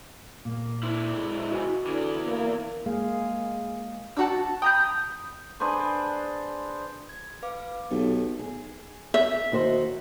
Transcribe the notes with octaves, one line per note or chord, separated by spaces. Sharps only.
A#2 A#3
D3 E4
G#3
F#4 B4 G#5
E2 D3 E3
A#3
G#3 A#3 G#4 F5
D4 F#4 F#5 A5 E6
G5 A#5 B5 D#6 G6
D4 G#4 B4 C5
G#6
B4 F5 D6
B1 G4 A4
G#4
E5
D#2 F#4 C5